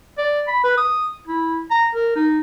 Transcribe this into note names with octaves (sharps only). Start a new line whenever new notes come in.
D5
B5
B4
D#6
E4
A#5
A#4
D#4